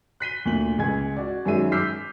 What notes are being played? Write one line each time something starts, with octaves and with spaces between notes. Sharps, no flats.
F#6 B6 D#7 G7
D2 A#2 F#7
C#2 G#4 G#6
F#4 D5
F#2 D#3 F#3 G#3 E5 D#7
D6 E6 F6 G6 B6 C7